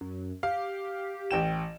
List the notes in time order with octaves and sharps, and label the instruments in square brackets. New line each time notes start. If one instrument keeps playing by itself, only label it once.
[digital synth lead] F#2
[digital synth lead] G4 [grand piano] F5
[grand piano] A1 G5 E7